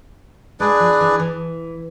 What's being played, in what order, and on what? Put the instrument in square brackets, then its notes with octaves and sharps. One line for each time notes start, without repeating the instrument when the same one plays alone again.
[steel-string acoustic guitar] G#3 [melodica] D4 G#4 B4 D5
[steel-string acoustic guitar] F3
E3
E3